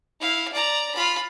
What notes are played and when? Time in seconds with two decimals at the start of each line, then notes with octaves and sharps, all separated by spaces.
0.20 E4 F5
0.53 D5 A#5
0.95 F4 B5